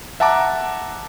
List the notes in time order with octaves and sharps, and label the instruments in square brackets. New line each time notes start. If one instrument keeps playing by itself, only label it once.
[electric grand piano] E5 F#5 A5 A#5 D6